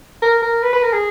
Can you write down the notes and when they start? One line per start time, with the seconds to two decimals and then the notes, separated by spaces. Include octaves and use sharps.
0.22 A#4
0.42 A#4
0.63 B4
0.73 B4
0.82 A#4
0.93 G#4